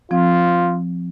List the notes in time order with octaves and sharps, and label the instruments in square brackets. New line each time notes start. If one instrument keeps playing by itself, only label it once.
[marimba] F3 C4 [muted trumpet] F4